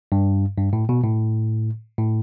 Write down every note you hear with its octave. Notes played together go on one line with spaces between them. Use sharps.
G2
G2
A2
B2
A2
A2